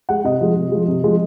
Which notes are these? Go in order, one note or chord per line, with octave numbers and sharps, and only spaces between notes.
G#3 F#5
C3 D#5
F3 G#3
C3
F3 G#3
C3
F3 G#3